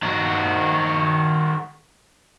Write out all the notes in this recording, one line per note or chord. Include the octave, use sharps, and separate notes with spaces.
D#3 F#4